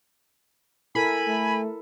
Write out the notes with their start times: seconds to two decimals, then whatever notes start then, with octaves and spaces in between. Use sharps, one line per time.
0.95 E4 A4 A#4 G#5 B5
1.28 A3